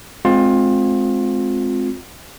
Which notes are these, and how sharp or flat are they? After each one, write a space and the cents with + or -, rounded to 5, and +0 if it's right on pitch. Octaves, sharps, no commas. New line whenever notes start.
G#3 +25 C4 +0 F4 +25